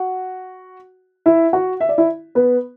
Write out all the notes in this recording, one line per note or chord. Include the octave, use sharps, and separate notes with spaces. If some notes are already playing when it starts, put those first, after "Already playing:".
Already playing: F#4 F#5
E4 E5
F#4 F#5
E5
D5
E4 E5
B3 B4